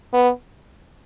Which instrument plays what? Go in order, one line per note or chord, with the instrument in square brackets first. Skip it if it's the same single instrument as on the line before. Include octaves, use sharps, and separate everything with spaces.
[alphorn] B3